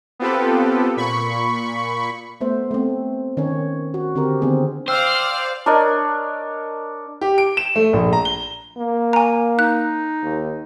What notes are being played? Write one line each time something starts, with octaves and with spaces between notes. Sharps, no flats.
B3 C4 F4 G4 A4 B4
A#2 B5 C#6
A3 B3 C5 E5
A3 C4
D#3 C#4 C#5
F#4
D3 C4 G4 A#4
D3 D#3 B3 C4 G#4
C5 D5 F5 G5 E6 F6
D4 A#4 C#5 D#5
G4
D7
E7
A3
A#1
A#5
G7
A#3
G#5 A#5
D#4 F#6
D#2